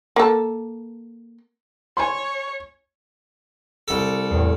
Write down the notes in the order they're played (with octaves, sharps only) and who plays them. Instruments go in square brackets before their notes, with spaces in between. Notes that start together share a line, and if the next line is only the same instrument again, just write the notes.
[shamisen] A#3 A4
[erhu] C#5 [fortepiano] G#5 C6
[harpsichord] C2 A4
[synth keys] E2 A2